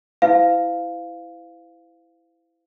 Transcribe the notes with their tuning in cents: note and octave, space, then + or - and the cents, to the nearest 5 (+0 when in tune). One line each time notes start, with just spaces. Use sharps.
E4 +0 C5 -40 F5 -5